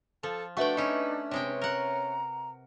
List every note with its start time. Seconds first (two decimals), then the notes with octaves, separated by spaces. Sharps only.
0.23 F3 A4
0.57 A3 D4 F#4 B4 E5 G5 C#6
0.77 C#4 D#4 E4
1.31 C3 G#3 C#4 G5
1.61 A#4 F#5 A#5